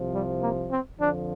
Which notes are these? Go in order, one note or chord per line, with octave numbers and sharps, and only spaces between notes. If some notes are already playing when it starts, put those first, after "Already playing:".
Already playing: C2 C3 F3
G3
A#3
C4
F2 D3 F3 D4